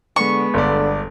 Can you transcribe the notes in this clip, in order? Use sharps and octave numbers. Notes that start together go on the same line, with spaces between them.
D3 G#3 B3 C#6
G1 D3 D5